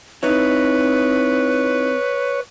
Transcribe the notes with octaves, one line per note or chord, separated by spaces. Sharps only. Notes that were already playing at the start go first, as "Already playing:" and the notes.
C4 D#4 E4 B4 C#5